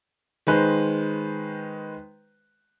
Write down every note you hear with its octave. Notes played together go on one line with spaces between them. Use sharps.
D#3 G#3 B4 C5